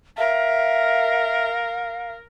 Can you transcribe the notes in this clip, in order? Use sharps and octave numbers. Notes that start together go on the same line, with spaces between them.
A#4 E5 F5